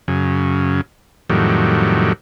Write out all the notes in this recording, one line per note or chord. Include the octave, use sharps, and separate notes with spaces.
F#2 C#3
F2 A2 D#3 F#3 G3